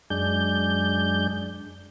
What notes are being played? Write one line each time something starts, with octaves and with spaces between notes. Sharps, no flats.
F#2 G#3 D4 G6